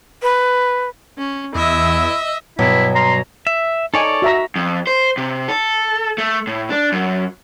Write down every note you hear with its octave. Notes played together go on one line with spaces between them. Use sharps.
B4
C#4
E2 E4 D#5 E5
G2 B2 F#3 E4
A#5 C6
E5
D#4 A4 C#5 D5 G#5
F#4 E5 A#5
F2
C5
C3
A4
A3
A2
D4
F#2